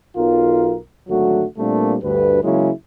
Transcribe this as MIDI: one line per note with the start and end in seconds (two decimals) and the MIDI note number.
0.17 0.76 35
0.17 0.76 65
0.17 0.76 70
1.08 1.44 32
1.08 1.44 50
1.08 1.44 54
1.08 1.44 57
1.08 1.44 66
1.58 1.96 46
1.58 1.96 55
1.58 1.96 57
1.58 1.96 58
1.58 1.96 60
1.58 1.96 62
2.03 2.42 38
2.03 2.42 43
2.03 2.42 71
2.43 2.70 49
2.43 2.70 54
2.43 2.70 56
2.43 2.70 58
2.43 2.70 61
2.43 2.70 64